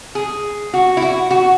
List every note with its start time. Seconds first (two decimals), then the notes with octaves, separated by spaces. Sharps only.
0.15 G#4
0.74 F#4
0.97 E4
1.02 F#4
1.31 F#4